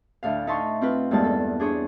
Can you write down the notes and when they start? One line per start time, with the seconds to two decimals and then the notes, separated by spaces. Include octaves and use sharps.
0.23 D2 A2 F5
0.47 D#4 E5 A5 C6 C#6
0.81 C4 F4 B4
1.11 E2 G2 G#3 A#3 A5
1.24 A4
1.60 D4 G#4 C5 C#5